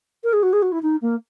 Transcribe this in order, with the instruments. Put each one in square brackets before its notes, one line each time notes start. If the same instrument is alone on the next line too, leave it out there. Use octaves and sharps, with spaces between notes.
[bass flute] A#4
G#4
F#4
G#4
F#4
E4
D#4
A#3